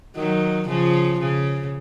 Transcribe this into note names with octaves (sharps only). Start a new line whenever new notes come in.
D#3 F#3
C#3 F3
C#3